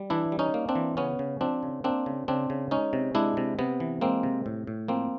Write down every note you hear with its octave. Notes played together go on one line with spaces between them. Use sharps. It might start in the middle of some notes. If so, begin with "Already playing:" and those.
Already playing: G3
E3 D4 E4
G3
C#4 D#4
A#3
C4 D4
E3
C#3 B3 C#4
C#3
F3 C4 D4
C#3
A#3 C4 D4
C#3
C#3 C4 D4
C#3
G#3 C#4 D#4
C3
G#3 D4 E4
C3
C3 B3
E3
G#3 A#3 C4
C3
A2
A2
F3 A#3 C4